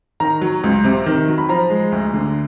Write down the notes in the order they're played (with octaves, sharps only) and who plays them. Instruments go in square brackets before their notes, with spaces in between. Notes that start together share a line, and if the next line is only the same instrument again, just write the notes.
[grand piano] D#3 A#5
F#3
C#2
C3
D#3
F#3
B5
F3 A#5
G#3
D2
D3